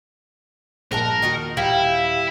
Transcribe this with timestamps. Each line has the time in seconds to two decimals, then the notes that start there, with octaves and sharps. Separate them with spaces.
0.92 A#1 G2 A#2 G#3 A#4 F#5 A5
1.22 D#2 D#4 F4 F#4
1.57 D#1 G3 E4 F5